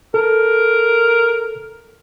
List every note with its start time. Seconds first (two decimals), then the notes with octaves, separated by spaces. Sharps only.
0.14 A4 A#4